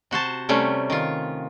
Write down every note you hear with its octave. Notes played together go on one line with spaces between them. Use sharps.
C3 F#4 C5 A5
C3 G3 A3 C#4
D#3 F4